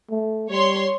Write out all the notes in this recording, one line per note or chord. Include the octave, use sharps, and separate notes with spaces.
A3
G3 C#5 C6